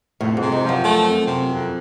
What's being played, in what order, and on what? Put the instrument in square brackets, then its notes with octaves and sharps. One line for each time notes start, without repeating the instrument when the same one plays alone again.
[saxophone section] F2 [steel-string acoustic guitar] A2
[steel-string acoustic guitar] G#2
[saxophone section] C3
[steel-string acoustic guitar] G#2
[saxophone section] F3
[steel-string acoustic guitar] F#2
[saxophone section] A3
F2
C3
F2